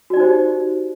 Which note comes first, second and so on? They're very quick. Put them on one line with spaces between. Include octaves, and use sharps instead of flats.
F#4 D5 D#4 C5 G4